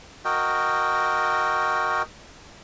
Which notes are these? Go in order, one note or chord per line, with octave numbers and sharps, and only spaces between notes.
F#4 A#4 D#5 G5